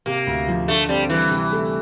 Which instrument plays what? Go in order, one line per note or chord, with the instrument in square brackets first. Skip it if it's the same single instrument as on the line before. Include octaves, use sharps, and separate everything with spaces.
[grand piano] C3 [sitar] A#3
[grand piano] D2
F3
[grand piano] D3 [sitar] A3
[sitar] G3 [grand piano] C4
[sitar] E3 [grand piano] G3
[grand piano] C3
A3